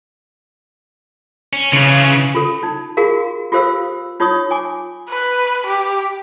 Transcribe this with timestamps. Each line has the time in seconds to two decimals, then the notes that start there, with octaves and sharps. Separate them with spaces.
1.53 C#4
1.73 C#3 E3 F4
2.35 F4 A4
2.63 D#4
2.97 F4 F#4 G#4 A#4 F5
3.52 F4 G4 A4 C5 F5 E6
4.20 D#4 F4 C#5 C#6 D#6
4.51 G#5 D6
5.09 B4
5.66 G4